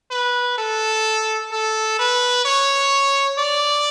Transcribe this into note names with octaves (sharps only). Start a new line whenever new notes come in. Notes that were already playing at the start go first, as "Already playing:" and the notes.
B4
A4
A4
B4
C#5
D5